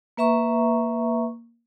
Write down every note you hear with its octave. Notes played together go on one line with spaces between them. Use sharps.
A#3 B4 E5 A#5 C#6